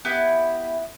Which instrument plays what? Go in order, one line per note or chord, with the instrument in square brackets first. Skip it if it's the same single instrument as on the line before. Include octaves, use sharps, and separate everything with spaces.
[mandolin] B3 E4 G4